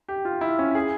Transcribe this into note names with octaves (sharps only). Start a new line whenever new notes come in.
G4
F4
E4
C#4
G#4